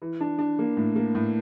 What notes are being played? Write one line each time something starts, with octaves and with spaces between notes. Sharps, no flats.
E3
D4
D4
A#3
A2
A#3
A2